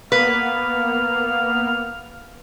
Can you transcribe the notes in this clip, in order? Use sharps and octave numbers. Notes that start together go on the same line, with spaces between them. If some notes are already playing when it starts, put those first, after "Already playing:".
A#3 B3 B4 F5